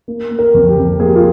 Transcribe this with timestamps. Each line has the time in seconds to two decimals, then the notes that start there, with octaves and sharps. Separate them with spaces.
0.08 A#3
0.31 A#3
0.39 A#4
0.54 F2
0.69 G4
0.77 F2
1.00 A#3 G#4
1.08 G4
1.15 F4